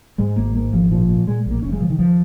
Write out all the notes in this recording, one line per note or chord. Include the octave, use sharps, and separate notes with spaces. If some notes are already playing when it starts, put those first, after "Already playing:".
G#2 G#3
G#1 A#3
G#2 A#3
G#1 F3
A#2 F3
A#2
A#2 G#3
A#1
A#3
F1 C#4
G#3
C#3 F3
D#3
D#2 F3